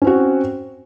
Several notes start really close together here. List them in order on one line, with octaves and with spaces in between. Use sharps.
C#4 C4 F#4